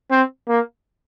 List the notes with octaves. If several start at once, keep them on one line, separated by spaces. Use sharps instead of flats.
C4
A#3